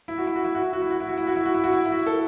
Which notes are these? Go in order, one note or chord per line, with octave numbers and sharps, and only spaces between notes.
E4
F#4
E4
F#4
E4
F#4
E4
F#4
E4
F#4
E4
F#4
E4
F#4
E4
F#4
E4
F#4
E4
E4
F#4
A4